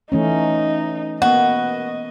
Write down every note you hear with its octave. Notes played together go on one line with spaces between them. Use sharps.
E3 A3 C#4 D#4
A#3 B3 F#4 D#5